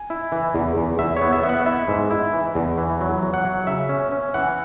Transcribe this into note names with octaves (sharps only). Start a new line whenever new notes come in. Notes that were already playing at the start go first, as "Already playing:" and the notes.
Already playing: G#5
E4
E3
E2
E2
E2 E5
C#5
B3
E5
B3 E5
F#5
E4 E5
G#2
E4
E3
E2
E3
F#3
F#3
F#5
F#3
C#3 E5
C#4
C#4
E3 F#5